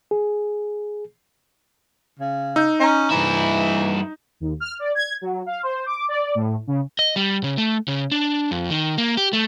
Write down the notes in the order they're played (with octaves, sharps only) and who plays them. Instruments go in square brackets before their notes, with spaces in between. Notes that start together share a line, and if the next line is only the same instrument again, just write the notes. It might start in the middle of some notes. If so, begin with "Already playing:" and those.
[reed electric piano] G#4
[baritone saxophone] C#3
[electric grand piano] D#4 [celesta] E6 G6
[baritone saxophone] C#4 [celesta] D#5 A#5
[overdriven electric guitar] G2 E4 [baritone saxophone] E3
[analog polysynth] D#2
F6
D5
G#6
F#3
F5
C5
D6
D5
A2
C#3
[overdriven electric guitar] D#5
G3
C#3
A3
C#3
D4
F2
D#3
A#3
G4
A3